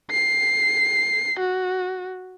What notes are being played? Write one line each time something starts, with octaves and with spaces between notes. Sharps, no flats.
C7
F#4